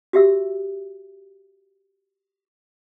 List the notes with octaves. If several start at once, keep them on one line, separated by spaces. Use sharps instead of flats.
F#4 G4 E5 E6